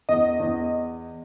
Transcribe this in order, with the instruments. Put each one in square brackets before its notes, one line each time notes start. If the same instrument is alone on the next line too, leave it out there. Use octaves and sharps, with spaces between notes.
[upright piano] E2 [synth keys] D#5
[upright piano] E2